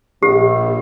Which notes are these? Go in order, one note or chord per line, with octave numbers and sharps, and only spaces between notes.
A#1 A#2 G4